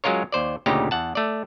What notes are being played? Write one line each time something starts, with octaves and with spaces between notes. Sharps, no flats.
F#3 G#3 C#4 F4 A#4 C#5
D#2 C5 D5
D2 A#2 C#3 D#4 G4 A#5
E2 F#5 A5
A3 D5